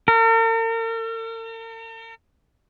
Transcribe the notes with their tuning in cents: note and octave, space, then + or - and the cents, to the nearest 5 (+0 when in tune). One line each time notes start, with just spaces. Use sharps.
A#4 -45